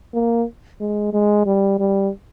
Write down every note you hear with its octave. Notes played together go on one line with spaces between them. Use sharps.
A#3
G#3
G#3
G3
G3